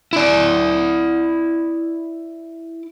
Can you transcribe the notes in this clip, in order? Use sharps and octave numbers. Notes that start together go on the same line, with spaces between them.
E4 D5